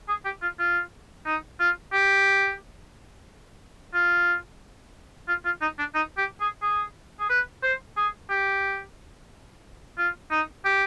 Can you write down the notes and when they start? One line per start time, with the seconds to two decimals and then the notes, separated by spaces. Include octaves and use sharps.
0.08 G#4
0.25 G4
0.42 F4
0.59 F4
1.26 D#4
1.60 F4
1.93 G4
3.94 F4
5.28 F4
5.45 F4
5.62 D#4
5.78 D4
5.95 D#4
6.18 G4
6.40 G#4
6.62 G#4
7.20 G#4
7.30 B4
7.63 C5
7.97 G#4
8.30 G4
9.98 F4
10.31 D#4
10.65 G4